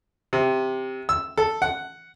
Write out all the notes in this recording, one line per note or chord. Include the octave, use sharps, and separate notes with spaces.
C3
E6
A4
F#5